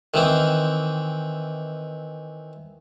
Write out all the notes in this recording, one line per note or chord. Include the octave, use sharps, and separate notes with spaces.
D#3 E3 C4